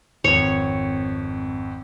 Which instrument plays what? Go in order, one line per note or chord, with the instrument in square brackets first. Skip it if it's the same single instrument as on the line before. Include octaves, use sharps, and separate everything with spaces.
[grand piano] G#1 F2 [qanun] C#5